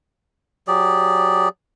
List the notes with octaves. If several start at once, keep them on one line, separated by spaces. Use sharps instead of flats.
F#3 G4 G#4 D5